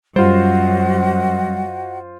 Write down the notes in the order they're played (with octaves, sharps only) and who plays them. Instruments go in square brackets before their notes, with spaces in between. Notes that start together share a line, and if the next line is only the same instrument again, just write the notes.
[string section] F#2 [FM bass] G3 [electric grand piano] F4 C5 [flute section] F#4 D#5 F#5